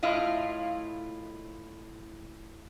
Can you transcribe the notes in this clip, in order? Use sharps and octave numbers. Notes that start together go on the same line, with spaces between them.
A2 E4 F4 D#5